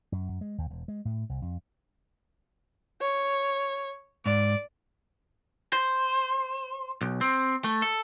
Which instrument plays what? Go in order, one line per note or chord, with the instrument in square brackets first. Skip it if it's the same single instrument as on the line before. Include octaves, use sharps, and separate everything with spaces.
[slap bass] F#2
F#2
G#3
D#2
E1
G#3
A2
C2
F2
[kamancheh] C#5
[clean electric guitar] G#2 [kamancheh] D5
[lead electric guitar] C5
B1
C4
A3
A4